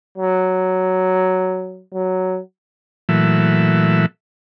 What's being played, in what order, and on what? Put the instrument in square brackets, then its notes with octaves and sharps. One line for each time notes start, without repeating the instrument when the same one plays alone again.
[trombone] F#3
F#3
[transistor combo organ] A#2 E3 F#3 A3 E5